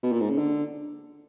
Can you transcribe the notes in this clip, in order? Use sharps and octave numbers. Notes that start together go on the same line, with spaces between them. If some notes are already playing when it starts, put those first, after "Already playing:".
B2
A#2
G#2
C#3
D3